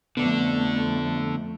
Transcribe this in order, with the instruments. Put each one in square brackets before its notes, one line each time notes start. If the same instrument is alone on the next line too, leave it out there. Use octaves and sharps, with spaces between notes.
[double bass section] F2 A3 [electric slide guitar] D3 D4 [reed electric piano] B3